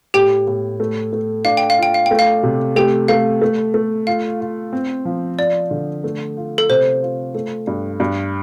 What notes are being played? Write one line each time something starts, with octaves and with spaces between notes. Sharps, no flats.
A2 G4 G5
A2
A3
A3
D4 F5
G5
F5
F4 G5
F5
A3 G5
F5
C3
A3 G4 G5
A3 F5
A3
A3
F4 F5
F4
C4
F3
F4 D5
D3
A3
F4
A4
C3 C5
F4
A3
G2
G2